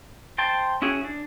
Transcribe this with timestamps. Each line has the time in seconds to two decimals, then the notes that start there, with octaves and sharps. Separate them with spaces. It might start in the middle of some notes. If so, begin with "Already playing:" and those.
0.38 C5 G5 A5 C6
0.82 C#4 E4 F#4 G#4
1.04 D4